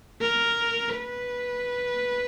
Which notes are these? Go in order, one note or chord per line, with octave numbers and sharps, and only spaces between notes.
A#4
B4